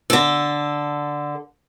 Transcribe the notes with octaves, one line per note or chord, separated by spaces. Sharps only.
D3 A4